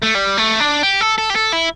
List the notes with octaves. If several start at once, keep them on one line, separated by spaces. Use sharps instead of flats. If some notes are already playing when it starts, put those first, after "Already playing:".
A3
G3
A3
D4
G4
A4
A4
G4
A4
E4